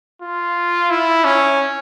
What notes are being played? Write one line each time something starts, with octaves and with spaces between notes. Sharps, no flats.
F4
E4
C#4